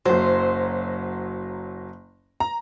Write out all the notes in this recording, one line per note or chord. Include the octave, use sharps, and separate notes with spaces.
F#1 F#3 C5
A#5